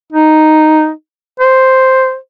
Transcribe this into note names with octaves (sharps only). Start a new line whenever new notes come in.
D#4
C5